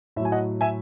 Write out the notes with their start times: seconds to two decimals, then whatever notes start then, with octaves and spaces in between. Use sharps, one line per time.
0.16 A2 E5
0.20 F#3
0.25 G#5
0.32 D#5 F#5
0.61 E5 G#5